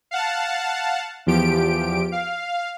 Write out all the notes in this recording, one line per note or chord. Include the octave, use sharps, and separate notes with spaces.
F5 F#5 A5
E2 F3 G4 D7
F5